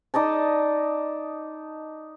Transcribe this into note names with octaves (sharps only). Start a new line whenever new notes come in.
D#4 D5 D#5 A5